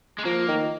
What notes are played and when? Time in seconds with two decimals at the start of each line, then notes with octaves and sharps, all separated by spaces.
0.18 G#3
0.25 F3 A#3
0.48 D#3